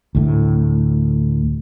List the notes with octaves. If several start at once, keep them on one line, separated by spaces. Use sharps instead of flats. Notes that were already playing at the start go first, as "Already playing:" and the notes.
D2 A2